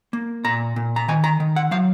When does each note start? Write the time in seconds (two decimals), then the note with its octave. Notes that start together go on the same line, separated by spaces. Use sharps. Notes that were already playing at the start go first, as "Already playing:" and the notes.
0.13 A#3
0.44 A#2 A#5
0.76 A#2
0.96 A#5
1.08 D#3 G#5
1.24 A#5
1.40 D#3
1.56 F#5
1.71 F#3 F5